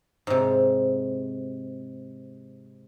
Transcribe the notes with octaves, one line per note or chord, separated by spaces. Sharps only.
G#2 C3